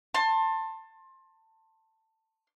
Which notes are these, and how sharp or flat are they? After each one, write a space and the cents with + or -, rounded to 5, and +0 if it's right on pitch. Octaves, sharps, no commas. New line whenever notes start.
A5 +20 C6 +25